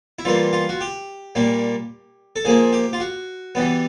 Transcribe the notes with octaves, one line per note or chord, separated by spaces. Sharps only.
E4
E3 G3 A#3 F4
F4
F#4
G4
A#2 G3 A#3
A4
A#2 F3 A#3 G#4
G4
F4
F#4
E3 G3 B3